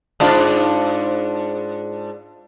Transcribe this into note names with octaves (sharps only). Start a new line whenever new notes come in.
G#2 D4 F4